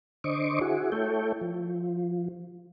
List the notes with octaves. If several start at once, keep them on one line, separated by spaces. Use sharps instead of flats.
D3 C5 D#5 C#6 D6
E4 F#4 G#4
A3 E4 A4 C#5 G5
F3